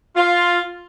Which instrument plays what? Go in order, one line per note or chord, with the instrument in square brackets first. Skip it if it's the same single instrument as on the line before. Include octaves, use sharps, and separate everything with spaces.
[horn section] F4